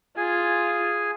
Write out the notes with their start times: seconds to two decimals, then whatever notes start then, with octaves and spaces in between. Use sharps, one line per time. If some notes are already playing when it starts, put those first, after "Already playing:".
0.17 F4 G#4 G#5